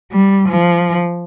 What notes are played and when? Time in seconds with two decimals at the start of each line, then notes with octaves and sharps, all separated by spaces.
0.12 G3
0.49 F3